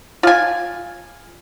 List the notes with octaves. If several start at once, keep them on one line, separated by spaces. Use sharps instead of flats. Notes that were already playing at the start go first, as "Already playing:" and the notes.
F4 G#5